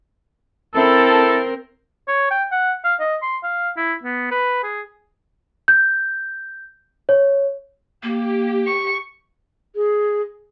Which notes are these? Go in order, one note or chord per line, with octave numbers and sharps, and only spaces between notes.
C4 E4 A4 A#4
C#5
G5
F#5
F5
D#5
C6
F5
E4
B3
B4
G#4
G6
C#5
A#3 G4
C#6
G#4